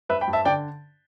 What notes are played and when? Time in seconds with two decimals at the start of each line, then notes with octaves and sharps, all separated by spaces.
0.09 G2 B4 E5
0.21 G5 B5
0.27 G2
0.33 E5 A5
0.45 D3 D5 G5